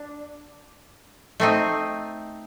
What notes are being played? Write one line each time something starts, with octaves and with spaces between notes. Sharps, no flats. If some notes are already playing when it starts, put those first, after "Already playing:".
Already playing: D4
A3 C4 D#4